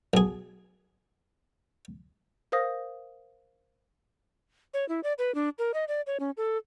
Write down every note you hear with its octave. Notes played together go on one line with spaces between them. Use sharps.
B1 G#4
A#4 C5 F5 D#6 A#6
C#5
E4
D5
B4
D4
A#4
D#5
D5
C#5
C#4
A4